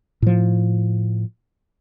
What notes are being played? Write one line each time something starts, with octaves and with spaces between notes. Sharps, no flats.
A2 F3